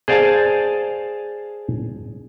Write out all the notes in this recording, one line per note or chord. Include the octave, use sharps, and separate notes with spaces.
G#4 C5 D5 F5 G#5 A5